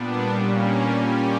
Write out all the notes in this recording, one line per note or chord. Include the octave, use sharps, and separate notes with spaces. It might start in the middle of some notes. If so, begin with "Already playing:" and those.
Already playing: A#2 G3 B3 D4
A#2 G3 A#3 C#4
A#2 G3 C#4 G4